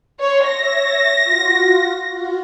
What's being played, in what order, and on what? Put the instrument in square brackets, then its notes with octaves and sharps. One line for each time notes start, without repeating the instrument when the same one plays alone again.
[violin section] C#5 [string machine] C6
[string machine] C#5 E5 [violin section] A#6
[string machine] F4 F#4
F4 F#4